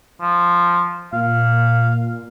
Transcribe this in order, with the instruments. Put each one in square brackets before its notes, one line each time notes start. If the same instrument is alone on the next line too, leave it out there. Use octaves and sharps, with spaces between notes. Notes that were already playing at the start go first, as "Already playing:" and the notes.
[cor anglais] F3
[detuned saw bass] A#2 [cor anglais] F5